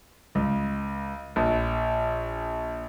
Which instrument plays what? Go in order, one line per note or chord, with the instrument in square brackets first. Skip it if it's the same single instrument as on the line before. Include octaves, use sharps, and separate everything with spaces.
[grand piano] C#2
A#1